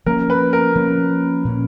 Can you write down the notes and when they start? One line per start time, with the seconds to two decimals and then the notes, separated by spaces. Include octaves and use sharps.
0.06 F3 A#3 C#4 A#4
0.30 B4
0.53 A#4
0.75 F3 A#3 C#4
1.45 A#2 F3 A#3 C#4